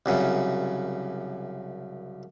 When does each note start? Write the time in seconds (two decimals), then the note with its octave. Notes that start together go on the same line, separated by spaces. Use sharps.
0.06 C2 F#2 C#3